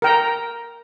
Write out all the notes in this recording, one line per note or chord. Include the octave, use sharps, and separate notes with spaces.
A#4 G5 A#5